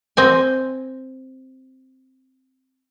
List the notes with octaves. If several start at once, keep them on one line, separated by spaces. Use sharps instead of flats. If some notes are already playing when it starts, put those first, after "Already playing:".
C4 D#5 G#5